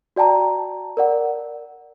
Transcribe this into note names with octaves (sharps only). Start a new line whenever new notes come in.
F#4 D5 G5 A5 A#5
A#4 D5 F#5